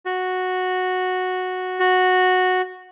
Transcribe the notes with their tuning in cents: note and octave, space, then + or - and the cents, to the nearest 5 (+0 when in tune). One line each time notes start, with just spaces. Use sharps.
F#4 -10
F#4 -10